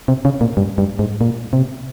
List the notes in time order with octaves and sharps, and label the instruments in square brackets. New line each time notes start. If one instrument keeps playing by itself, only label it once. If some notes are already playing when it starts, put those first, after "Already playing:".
[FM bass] C3
C#3
A#2
G2
G2
G#2
A#2
C3